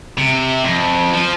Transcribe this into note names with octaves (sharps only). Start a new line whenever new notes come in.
C3
F2
F3